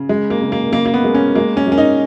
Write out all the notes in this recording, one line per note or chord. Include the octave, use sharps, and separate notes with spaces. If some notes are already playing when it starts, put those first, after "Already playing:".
Already playing: C#3
G#3
A#3
C#3
A#3
C#3 A#3
A#3
B3
G#3
C#4
G#3 A#3
C#4
G#3 C#4
D#4